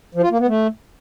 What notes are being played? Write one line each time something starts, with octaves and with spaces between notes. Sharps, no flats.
F3
F4
A#3
B3
A3